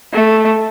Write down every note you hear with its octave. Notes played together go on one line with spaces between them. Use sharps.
A3